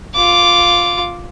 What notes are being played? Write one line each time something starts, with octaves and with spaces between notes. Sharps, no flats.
F4 D6